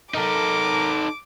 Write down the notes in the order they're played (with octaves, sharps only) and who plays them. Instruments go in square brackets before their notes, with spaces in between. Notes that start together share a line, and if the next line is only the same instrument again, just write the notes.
[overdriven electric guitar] D#4 A4 [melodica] A#4 [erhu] D6